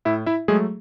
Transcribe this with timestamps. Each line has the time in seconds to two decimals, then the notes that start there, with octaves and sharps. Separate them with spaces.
0.05 A2 E4 E5
0.26 E4 E5
0.48 F#3 G#3 A3 G#4